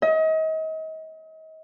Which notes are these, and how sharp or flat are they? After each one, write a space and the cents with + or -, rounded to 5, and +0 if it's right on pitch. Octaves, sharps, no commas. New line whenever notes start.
D#5 +35